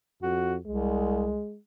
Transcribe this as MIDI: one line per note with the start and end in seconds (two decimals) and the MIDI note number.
0.22 0.58 41
0.22 0.55 66
0.66 1.40 36
0.66 1.58 56